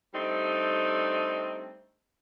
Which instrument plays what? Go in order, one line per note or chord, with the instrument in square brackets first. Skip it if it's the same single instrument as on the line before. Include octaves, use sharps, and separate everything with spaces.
[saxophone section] G3 A3 C4 D4 D#4